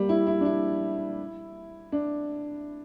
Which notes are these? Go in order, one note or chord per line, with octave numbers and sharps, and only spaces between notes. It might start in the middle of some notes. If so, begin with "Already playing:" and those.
Already playing: G3 A#3
E4
E4
D4
E4
D4